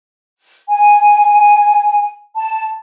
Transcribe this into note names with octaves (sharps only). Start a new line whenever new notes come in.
G#5
A5